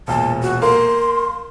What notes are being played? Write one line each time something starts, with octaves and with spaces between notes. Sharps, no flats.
E1 A#2 A5
F#4
A#3 C6